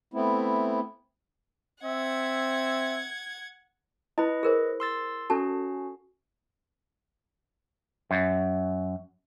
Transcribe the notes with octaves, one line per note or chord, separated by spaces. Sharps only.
A3 B3 C4 E4
C4 E5 F#5 G#6
E4 B4 D#5 B5
G#4 A#4 C5
C6 E6 A6
C#4 F#4 A4 A5
F#2